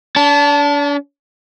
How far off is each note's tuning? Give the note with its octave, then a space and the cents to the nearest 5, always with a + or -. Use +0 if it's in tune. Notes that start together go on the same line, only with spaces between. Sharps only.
D4 -40 A5 +0